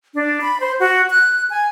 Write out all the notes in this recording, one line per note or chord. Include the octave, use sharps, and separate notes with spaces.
D4
B5
C5
F#4
F#6
G#5